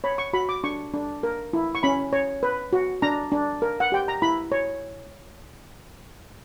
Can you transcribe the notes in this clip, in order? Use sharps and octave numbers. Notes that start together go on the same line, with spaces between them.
C#5 B5
C#6
F#4 B5
D6
D4 C#6
D4
A#4
E4
C#6
C#4 B5
C#5
B4
F#4
D4 A#5
D4
A#4
F#5
G4 G5
A#5
E4 B5
C#5